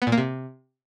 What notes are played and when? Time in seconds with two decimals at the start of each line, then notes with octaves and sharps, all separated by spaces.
0.02 B3
0.07 A#2
0.12 A#3
0.18 C3